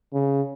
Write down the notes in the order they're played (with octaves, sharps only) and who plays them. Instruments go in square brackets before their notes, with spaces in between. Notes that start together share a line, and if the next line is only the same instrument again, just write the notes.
[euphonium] C#3